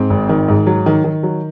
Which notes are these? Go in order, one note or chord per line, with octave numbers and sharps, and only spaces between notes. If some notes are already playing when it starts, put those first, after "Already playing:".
Already playing: G#2 C4
G#1
D#3
G#2
F#3
D#3
D#3
F#3